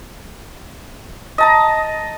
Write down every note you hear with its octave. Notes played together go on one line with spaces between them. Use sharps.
D#5 A5 A#5